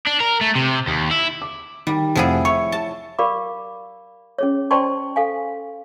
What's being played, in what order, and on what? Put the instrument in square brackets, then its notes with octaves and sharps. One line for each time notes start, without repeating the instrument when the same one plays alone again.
[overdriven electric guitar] D4
A#4
A3
C3
D#2
E4
[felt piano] D6
[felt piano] D#3 [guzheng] G3
[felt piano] F1 F5 F#5 [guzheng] F3 E4 G#4
[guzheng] C#5 [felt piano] E5 C#6
[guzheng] A5
[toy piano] G4 A#4 D5 F5 B5 D6
C#4 G#4 C#5
C5 D5 G5 A5 C6 C#6
A4 F5 G#5